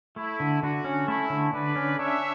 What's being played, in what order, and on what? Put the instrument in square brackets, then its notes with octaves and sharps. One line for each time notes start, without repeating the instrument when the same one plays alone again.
[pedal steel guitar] A3 [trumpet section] E4
[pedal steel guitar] D3
[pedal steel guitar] D3 [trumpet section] F#4
[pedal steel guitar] C#4
[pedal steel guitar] A3 [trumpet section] E4
[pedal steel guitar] D3
[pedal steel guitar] D3 [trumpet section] B4 D5
[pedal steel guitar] C#4
[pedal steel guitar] D4 [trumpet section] C#5 E5